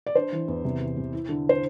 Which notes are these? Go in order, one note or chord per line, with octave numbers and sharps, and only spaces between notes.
D5
D4 C5
E3
E2
C3
E3
C3
E4
D3
C5